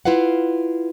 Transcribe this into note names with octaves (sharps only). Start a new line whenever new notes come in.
E4 F4 B4 F5 F#5